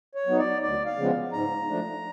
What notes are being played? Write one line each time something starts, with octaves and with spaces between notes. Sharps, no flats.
C#5
F#3 B3 D#4
D5
D2 D5
F5
C#3 F3 G#3 B3
G#2 A#5
F3 A3 D4